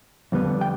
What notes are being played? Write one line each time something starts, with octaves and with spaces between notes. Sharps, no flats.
F2 D3 G3 B3 D4
G5